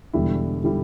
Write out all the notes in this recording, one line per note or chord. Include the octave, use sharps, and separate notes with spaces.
E1 E2 D3 G3 E4
D3 G3 E4